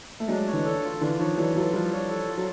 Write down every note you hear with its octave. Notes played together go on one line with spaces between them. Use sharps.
A3
F#3 G#3 D4
C#5
D3 E3
A4
F4
D3 E3 D4
D#3 F3 C#5
E3 F#3 A4
E3 F#3 F4
F3 G3 D4
C#5
A4
F4
F#3